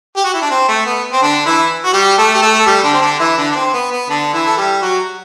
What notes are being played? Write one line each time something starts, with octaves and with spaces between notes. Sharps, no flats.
G4
F#4
E4
D4
C4
A3
B3
C4
D3 D4
E3 E4
F#4
G3 G4
A3 A4
G4
A3 A4
A4
G3 G4
D3 D4
C4
D3 D4
E3 E4
D3 D4
D4
C4
B3
B3
D3 D4
E3 E4
A4
G3 G4
F#3 F#4